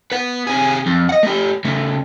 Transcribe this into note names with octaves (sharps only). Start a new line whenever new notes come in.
B4 F#5
C3 G#4
F2
D#5 F#5
A3 G4
C#3 A3